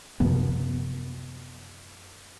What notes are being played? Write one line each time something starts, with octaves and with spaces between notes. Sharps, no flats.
F#2 C3 F3 B3